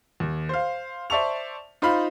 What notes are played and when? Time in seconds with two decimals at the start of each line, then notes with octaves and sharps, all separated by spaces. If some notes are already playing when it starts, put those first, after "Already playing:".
0.20 D#2
0.49 C5 F5
1.10 C5 D5 E5 A5 C#6 F7
1.82 D#4 F4 C5 F5 B5